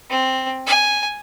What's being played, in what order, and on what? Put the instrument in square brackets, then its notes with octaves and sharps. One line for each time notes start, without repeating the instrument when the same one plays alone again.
[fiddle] C4
G#5